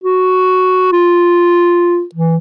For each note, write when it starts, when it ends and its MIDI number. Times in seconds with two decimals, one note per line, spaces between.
0.03 0.89 66
0.92 2.03 65
2.14 2.37 52